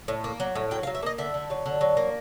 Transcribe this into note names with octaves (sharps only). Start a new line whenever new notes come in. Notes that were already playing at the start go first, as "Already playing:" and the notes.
A2
A#3
F#3
A2
F#3 G5
F5
F#3
E5
A#3 D#5
D3 E5
D3
F#3
D3
F#3
A#3